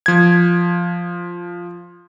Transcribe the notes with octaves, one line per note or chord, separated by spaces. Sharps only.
F3 G#6